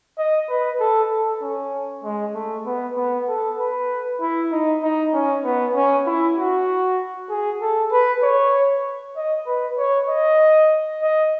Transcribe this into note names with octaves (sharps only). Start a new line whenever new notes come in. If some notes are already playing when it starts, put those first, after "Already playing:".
D#5
B4
A4
A4
C#4
G#3
A3
B3
B3
A4
B4
E4
D#4
D#4
C#4
B3
C#4
E4
F#4
G#4
A4
B4
C#5
D#5
B4
C#5
D#5
D#5